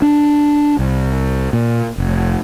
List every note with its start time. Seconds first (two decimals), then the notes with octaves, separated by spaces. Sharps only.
0.02 D4
0.79 C2
1.53 A#2
1.98 F1